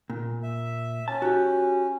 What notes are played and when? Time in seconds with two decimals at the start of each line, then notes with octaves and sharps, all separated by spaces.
0.10 A#2
0.43 E5
1.08 C#4 A5
1.22 F#4 G4